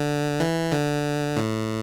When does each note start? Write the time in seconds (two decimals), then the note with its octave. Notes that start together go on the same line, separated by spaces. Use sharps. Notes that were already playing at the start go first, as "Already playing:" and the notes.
Already playing: D3
0.40 E3
0.72 D3
1.37 A2